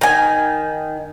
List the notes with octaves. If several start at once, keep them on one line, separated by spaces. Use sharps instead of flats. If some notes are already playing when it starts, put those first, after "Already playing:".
D#3 G#5